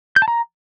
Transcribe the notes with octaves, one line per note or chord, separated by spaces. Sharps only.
G6
A5
A#5